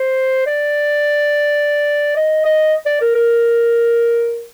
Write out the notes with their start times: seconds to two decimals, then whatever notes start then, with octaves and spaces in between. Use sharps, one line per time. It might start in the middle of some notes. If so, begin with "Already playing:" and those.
Already playing: C5
0.47 D5
2.17 D#5
2.45 D#5
2.86 D5
3.01 A#4
3.15 A#4